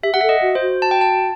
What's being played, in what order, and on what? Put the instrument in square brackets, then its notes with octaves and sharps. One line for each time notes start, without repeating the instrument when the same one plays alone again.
[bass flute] G4 [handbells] E5
[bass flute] G4 [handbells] F#5
[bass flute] A4 [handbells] E5
[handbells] D#5
[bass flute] F#4
[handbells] C5
[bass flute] F#4
[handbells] A5
G5
A5